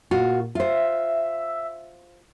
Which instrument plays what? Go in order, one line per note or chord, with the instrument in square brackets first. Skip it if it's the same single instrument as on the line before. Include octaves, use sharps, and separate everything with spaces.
[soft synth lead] A#2 [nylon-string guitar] F4 F#4
[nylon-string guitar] F4 C5 [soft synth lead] E5